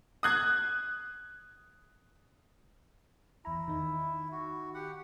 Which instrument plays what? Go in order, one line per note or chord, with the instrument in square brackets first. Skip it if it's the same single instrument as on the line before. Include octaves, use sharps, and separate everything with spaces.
[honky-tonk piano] D#6 F#6 G#6
[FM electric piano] E2 A#5 [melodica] E4
[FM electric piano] D#3 D#4
[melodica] F#4
G4 F#5